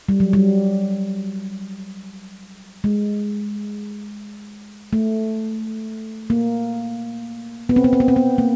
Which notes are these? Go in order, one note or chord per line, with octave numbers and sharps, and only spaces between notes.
G3
F#3
G3
G#3
A3
A#3
B3
C4
B3
C4
B3
C4
B3
A#3